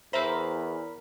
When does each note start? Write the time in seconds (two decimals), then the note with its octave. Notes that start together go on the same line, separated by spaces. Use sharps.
0.13 E2 A#4 C5 E5 A#5 B5